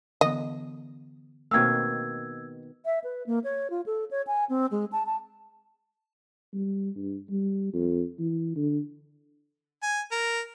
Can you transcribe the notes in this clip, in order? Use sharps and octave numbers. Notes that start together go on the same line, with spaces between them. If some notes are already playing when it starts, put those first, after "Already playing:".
D3 E3 B3 D#5
B2 D#3 A3 A#3 C4 F5 E6 G#6
E5
B4
A#3
C#5
F4
A4
C#5
G#5
C4
G#3
A5
A5
G3
G2
G3
F2
E3
D3
G#5
A#4